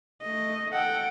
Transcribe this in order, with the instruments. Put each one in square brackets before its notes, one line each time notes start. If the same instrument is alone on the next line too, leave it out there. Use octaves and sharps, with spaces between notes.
[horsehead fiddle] A3 D#5
[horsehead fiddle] A4 G5 [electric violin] F#5 D7